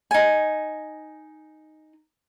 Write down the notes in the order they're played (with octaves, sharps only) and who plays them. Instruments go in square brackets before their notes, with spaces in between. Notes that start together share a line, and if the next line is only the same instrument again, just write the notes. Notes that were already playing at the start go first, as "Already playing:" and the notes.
[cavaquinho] D#4 G#5